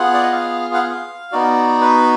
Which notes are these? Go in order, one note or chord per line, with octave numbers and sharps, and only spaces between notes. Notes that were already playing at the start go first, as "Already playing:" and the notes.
Already playing: B3 F4 G#4 F#5
D5
D#5
F5
F#5
F5
B3 D#4 F#4 D5
B4